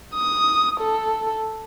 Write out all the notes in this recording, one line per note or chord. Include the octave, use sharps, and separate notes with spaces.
D#6
A4